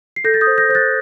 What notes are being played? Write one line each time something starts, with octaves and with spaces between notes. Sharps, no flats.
C7
A4 G6 A#6
A6
D#6 G6
C5
G6 A#6
C5 G6
F#6 A6